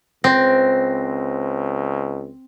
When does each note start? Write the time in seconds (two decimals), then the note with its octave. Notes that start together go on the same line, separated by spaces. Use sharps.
0.24 C#2 C4 C5 A#6